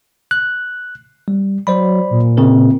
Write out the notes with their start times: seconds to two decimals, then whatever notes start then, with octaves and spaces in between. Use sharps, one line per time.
0.31 F#6
1.28 G3
1.67 F#3 C5 D5 B5
2.11 A#2
2.37 C#3 C4 A#4